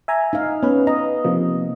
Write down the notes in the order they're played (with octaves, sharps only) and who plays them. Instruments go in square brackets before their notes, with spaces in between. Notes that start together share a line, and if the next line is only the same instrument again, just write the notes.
[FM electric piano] E5 G#5 A#5
[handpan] D#4 F5
[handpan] B3 [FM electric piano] C#4 B4
[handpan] D#5 [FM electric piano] A#5
[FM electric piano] C3 F3 A#3